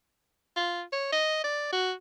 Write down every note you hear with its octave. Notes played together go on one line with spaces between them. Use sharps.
F4
C#5
D#5
D5
F#4